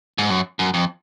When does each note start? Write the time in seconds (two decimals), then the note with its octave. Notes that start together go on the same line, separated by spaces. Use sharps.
0.18 G#2
0.30 F#2
0.59 F#2
0.74 F2